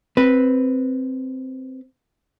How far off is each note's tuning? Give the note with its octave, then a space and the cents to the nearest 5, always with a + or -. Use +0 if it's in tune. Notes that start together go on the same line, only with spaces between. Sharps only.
C4 +0 B4 +0